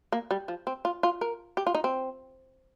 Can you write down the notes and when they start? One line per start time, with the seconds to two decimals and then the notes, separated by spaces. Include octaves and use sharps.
0.12 A#3
0.31 G3
0.48 F3
0.67 C4
0.85 F4
1.03 F4
1.21 A#4
1.57 G4
1.67 F4
1.75 D#4
1.84 C4